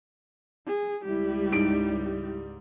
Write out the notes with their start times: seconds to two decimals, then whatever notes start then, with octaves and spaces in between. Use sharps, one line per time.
0.66 G#4
1.05 C#2 G3 E4 G4
1.52 G#2 D7